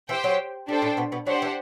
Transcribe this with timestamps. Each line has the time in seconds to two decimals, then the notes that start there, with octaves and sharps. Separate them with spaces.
0.09 E3 G4 C5 G5
0.24 F#3
0.68 G3 D4 A4 C5 G5
0.82 A2 A3
0.97 B2 B3
1.12 B2 B3
1.27 F#3 D4 G4 C5 F#5
1.42 E3